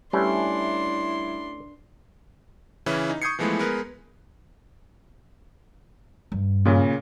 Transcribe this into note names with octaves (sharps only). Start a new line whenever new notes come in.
G3 A3 C#4 D4 E4 B4 C6
C#3 E3 C#4 E4
D#4
C#6 D#6 G6 G#6 C7 C#7
E3 F3 G#3 A3 B3 E4
G#3 B3 A#4 B4
G2
A#2 C#3